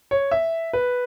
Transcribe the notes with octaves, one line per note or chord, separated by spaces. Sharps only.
C#5
E5
B4